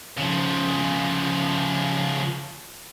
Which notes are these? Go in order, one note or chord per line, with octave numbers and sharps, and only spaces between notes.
C#3 F3